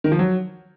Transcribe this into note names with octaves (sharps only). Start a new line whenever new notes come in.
D#3
F3
F#3